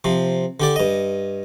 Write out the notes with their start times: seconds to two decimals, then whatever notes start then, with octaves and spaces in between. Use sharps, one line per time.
0.04 C3 F3
0.60 D3 G4 D5
0.76 G2 D#5